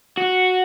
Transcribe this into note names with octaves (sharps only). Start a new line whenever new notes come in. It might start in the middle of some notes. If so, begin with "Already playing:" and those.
F#4